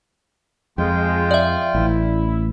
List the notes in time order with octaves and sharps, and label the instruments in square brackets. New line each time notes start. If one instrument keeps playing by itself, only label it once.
[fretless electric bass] F2 [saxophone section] G#3 [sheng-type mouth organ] F4 G5
[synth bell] D5 E5
[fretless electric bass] A1 [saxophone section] E4